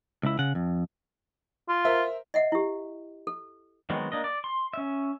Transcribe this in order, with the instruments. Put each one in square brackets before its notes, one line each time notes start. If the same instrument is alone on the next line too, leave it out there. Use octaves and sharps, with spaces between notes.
[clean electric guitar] C#2 E4
C#3 F#5
F2
[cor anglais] F4
[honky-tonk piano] A#4 C5 E5
[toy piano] D#5 E5 F#5
E4 G4
A4
[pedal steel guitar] D#3 F#3 G#3 B3 C4
A#3 D4 D#5
D5
C6
C#4 E5